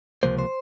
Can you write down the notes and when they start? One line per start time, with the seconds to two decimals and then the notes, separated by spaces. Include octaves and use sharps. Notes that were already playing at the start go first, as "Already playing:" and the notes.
0.23 C#2 C3 F3 A#3 C5
0.39 C5